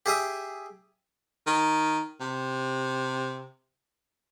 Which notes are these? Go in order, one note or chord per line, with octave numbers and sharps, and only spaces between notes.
G4 G#4 E5 D#6
D#3
C3